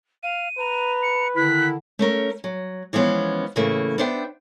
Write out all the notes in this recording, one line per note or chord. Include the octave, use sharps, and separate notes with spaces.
F5 D#7
B4 A#5
C#7
D3 D#3 E4 F#6 B6
A3 C#4 A#4 C#5
F#3
E3 F3 G#3 B3 C#4
A2 C#3 E3 A3 A#3
B3 D4 C5 E5 G5